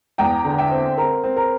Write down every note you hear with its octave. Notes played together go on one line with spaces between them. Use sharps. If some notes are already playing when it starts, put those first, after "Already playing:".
E2 G5 A#5
D3
E5 G5
C4
C4 A#4
C4
A#4